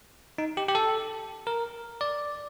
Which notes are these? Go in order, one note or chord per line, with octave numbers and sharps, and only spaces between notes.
D#4
G4
G4
A4
A#4
D5